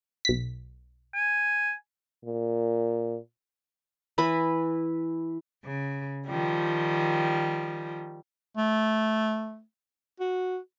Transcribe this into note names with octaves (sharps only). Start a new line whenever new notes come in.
B1 B6
G#5
A#2
E3 E4 B4 B5
C#3
D#3 F3 G3
A3
F#4